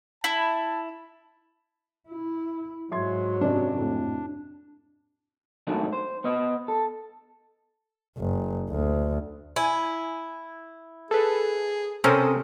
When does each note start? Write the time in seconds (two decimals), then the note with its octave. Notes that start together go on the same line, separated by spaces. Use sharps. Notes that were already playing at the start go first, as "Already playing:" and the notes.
0.24 E4 A5
2.08 E4
2.91 G#2 F#3 E5 C6 G#6
3.41 F#2 C3 D4 D5
3.78 F2 A2 C3
5.67 G#2 D#3 F#3 A3 C#4 D4
5.93 C5
6.24 B3 B4 D#5
6.68 A4
8.18 F#1
8.71 D2
9.56 E4 G#5
11.11 G#4 A4 B4
12.04 C3 C4 C#4 A4 A#4 C5 D#6